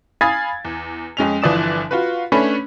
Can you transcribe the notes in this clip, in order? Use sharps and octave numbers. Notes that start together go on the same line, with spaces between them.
F5 G#5 B5 D#6 G#6 A6
E2
F2 G#3 C#4 F7
G1 E3 F3 D5 D#6 E7
F4 F#4 B4
A3 C#4 D4 B4 C#5 B5